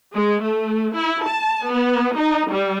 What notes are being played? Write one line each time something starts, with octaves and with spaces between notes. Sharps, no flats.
G#3
A3
E4
A5
B3
D#4
G3